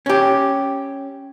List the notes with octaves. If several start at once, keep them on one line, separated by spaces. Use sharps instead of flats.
C#4 G4